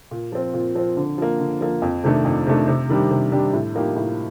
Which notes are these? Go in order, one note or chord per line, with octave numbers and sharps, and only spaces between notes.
A#2
F3 C4
A#2
F3 C4
D3
F3 A#3
D3
F3 A#3
F2
C3 D#3 A3 D4
F2
C3 D#3 A3 D4
C3
D#3 G3 D4 G4
C3
D#3 G3 D4 G4
A2
F3 A#3 D#4 G4
A2